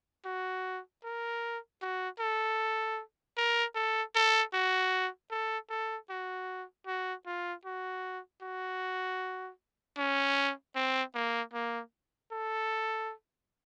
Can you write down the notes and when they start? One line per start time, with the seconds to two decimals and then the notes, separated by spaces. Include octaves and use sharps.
0.25 F#4
1.04 A#4
1.82 F#4
2.19 A4
3.37 A#4
3.75 A4
4.15 A4
4.54 F#4
5.31 A4
5.69 A4
6.09 F#4
6.86 F#4
7.26 F4
7.65 F#4
8.42 F#4
9.98 C#4
10.75 C4
11.14 A#3
11.54 A#3
12.31 A4